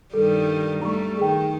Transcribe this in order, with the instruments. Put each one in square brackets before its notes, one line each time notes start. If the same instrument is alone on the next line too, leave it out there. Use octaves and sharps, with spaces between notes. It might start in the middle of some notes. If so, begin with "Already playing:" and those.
[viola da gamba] G2 D#3 G3 [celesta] A4
[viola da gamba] G3 A3 [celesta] A#5 C#6
[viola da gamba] D#3 [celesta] G#4 G5